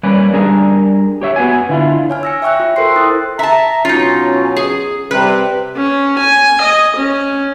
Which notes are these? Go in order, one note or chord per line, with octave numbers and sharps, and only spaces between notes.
G3 A#3 C#4 B4 D5
G3 D4 G#4 A#4
G4 C#5 E5
B3 F#4 G#5
D3 E4 F4
C#5 G#5 F6
E6 A#6 C#7
E5 G5 C#6 E6 F#6
F4
A4 A#4 C5 G5 C6 C7
E4 G5 D#6 F#6 A6
E5 A5 A#5
B2 F#3 C#4 D#4 F4
G#4
C3 G3 B4
C#4
G#5
D#5
C#4